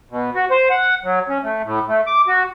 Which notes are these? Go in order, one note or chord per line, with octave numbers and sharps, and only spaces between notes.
B2
F#4
C5
F#5
F#3
C#4
A3
A2
A3
D6
F#4